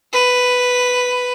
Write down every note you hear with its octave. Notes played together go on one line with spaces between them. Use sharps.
B4